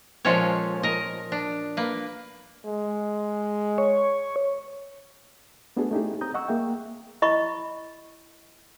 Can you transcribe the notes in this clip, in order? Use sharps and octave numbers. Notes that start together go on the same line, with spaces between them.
A#2 F3 G#3 C#4 A4 C#5
A#4 D#5
D4
A#3 B4
G#3
C#5
A3 B3 D4 F#4 G#4 A4
A3 C#4 D#4 E4 G4 G#4
C4 A#5 D#6 G6
D#5 F#5 C#6 E6
A#3 G#4 E5 G5
E4 D#5 B5 C#6